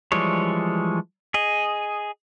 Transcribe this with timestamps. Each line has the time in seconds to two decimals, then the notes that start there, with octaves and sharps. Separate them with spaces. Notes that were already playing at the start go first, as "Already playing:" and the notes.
0.12 E3 F3 G3 G#3 C#5
1.34 G#4 D#5